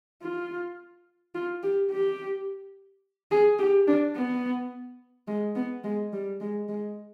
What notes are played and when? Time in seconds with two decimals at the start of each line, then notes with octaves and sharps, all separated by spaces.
0.22 F4
1.35 F4
1.63 G4
1.91 G4
3.31 G#4
3.59 G4
3.87 D4
4.16 B3
5.28 G#3
5.56 B3
5.84 G#3
6.13 G3
6.41 G#3
6.69 G#3